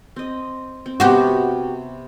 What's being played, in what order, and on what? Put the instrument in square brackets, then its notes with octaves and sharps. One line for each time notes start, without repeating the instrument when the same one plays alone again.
[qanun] C4 D#5
C4
[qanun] C3 B3 [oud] F#4 G4